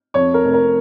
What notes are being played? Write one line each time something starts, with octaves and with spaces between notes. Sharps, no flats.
F2 C#5
A#4
F1
A#4